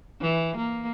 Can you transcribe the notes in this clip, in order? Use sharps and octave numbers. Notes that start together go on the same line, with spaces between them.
E3
A#3